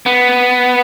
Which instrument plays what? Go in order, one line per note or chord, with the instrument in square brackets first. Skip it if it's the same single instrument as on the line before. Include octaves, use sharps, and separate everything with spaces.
[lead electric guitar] B3